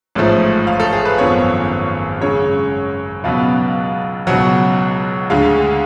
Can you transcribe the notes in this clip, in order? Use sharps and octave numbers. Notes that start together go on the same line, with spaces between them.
A1 G#2 F3 A3
F5
A4
G#4
B4
G#1 F#2 F3 B3 C#5
F#2 C#3 G#3 C#5
C#2 B2 F#3 B3 F5
C#2 B2 F#3 F#5
D2 D3 G#3 F5